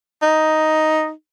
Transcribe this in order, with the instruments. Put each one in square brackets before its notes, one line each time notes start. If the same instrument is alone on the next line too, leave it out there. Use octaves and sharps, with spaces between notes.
[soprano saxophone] D#4